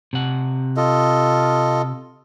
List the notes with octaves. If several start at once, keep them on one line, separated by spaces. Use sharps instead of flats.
C3 F#5
F4 A4 D#5